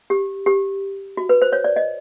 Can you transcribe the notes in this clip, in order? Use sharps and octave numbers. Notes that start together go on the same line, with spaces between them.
G4
G4
F#4
B4
C5
C#5
D5
D#5